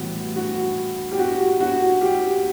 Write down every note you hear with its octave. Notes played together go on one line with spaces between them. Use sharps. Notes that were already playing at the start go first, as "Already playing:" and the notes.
Already playing: A2 E3 G3 B3 F#4
F#4
G4
F#4
F#4
G4